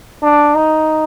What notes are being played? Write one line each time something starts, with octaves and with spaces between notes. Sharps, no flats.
D4
D#4